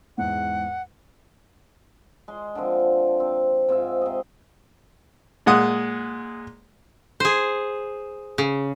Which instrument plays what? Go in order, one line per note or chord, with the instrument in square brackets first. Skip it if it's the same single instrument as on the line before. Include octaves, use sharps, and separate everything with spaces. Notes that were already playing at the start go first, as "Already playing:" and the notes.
[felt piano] E2 G#2 [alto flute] F#5
[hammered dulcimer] G#3 C6
D3 D#3 F3 C4
C5
C4
G#2 C4 F4 E5
C3 D#5
[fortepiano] A#2 G#3 F#5 D#6
[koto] G#4 C5
C#3